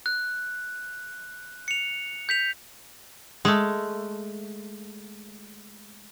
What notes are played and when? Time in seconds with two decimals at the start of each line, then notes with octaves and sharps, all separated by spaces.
0.06 F#6
1.68 C#7 F7
2.29 G6 B6 F7
3.45 G#3 A3